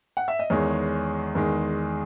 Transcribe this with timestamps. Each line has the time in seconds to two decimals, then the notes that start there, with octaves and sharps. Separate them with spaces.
0.17 F#5
0.28 E5
0.39 D#5
0.50 E2 D#3 G#3 C#5
1.35 E2 D#3 G#3